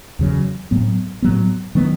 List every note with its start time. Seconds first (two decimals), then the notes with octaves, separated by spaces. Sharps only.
0.19 E2 C#3 F#3
0.71 A2 F#3 B3
1.22 A2 F#3 B3
1.75 D#3 F#3 B3